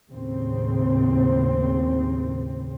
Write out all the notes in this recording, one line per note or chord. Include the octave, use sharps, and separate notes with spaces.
D#2 A2 C#3 C4